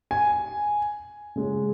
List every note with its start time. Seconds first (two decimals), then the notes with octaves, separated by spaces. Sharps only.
0.11 G#5
1.36 C#3 G#3 C#4